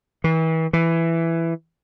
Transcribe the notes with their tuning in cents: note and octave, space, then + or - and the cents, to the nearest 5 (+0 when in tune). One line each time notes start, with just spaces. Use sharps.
E3 -35
E3 +10